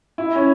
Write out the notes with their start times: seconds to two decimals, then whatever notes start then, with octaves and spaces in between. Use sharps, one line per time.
0.18 E4
0.36 C#4